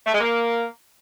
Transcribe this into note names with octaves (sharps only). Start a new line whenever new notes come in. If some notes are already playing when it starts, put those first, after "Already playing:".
A3
G#3
A#3